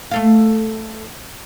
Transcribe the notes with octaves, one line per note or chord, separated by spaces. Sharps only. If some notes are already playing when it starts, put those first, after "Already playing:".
A3 A4 F5